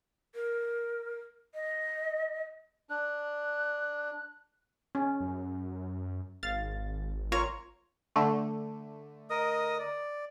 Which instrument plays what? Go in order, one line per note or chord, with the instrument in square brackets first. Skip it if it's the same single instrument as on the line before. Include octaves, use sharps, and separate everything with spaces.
[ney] A#4
D#5
[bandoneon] D4 [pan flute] F#6
[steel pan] C#4
[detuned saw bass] F#2
[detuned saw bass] G#1 [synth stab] F5 A6
[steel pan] F4 [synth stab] A#4 [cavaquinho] C#5
[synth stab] D3 A3
[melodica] A#4 D#5 D#6
D5